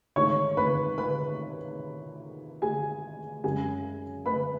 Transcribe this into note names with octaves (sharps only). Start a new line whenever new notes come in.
G#2 D#3 A3 C#5 C#6
B4 B5
B4 B5
G#4 G#5
F#2 C#3 G#3 G#4 G#5
B4 B5